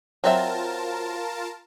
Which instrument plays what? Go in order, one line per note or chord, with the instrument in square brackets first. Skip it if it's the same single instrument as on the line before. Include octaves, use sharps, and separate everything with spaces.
[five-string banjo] F#3 C4 E5 [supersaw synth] F4 A#4 A5